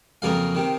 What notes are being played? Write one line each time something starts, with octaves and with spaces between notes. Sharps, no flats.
F2 C#3 F#3 A#3 F5
C3 D#3